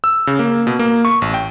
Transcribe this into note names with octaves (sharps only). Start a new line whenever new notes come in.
E6
C#3
A#3
B2
A#3
C#6
A1
G5